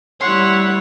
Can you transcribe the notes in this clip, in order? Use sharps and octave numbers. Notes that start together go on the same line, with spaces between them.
G3 E4 C#5 F#5 C6